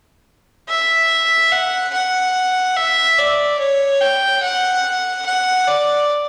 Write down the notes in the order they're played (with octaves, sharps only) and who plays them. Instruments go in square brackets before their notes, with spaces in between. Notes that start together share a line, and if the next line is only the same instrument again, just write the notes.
[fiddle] E5
F#5
F#5
E5
D5
C#5
G5
F#5
F#5
D5